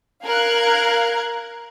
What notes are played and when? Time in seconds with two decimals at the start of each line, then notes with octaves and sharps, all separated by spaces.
0.24 A#4 F5 F#6 G#6